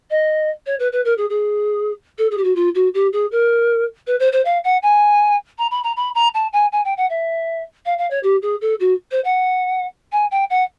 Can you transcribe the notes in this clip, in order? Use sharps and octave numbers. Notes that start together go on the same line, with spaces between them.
D#5
C#5
B4
B4
A#4
G#4
G#4
A4
G#4
G4
F#4
F4
F#4
G4
G#4
A#4
B4
C5
C5
F5
F#5
G#5
A#5
B5
A#5
B5
A#5
A5
G#5
G#5
G5
F#5
E5
F5
F5
C#5
G4
G#4
A4
F#4
C5
F#5
G#5
G5
F#5